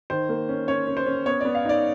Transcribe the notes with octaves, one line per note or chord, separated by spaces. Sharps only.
D#3 C5
A#3
C#4
C#4 C#5
C#4
C5
C#4
B3 C#5
B3 D5
F5
D#4 D5